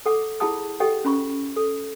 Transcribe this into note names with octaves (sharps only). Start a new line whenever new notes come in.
A4 F#5 D6
E4 F4 G#4 F#5 A5 D#6
G4 A4 D#5 F#5 G5
C#4 F4 B5 C#6
A4